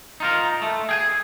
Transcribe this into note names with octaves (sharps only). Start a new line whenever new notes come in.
D#4 F4 A#4
A3
G#4 G5 G#5